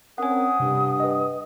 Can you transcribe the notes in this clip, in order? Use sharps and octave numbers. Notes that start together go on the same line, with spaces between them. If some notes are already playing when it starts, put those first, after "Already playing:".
C4 C#4 A#4 F#5 G#5 D#6
G2 C3
B4 D#5